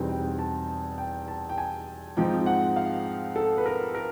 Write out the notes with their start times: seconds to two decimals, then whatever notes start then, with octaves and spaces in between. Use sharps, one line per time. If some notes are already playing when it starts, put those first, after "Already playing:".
Already playing: E2 B2 G3 C4 D#4 G#5
0.09 G5
0.38 A5
0.98 G5
1.28 A5
1.49 G5
1.58 G#5
2.17 G#2 F3 G#3 C4 D#4 G5
2.46 F#5
2.76 F5
3.36 A4
3.58 B4
3.66 A#4
3.95 A#4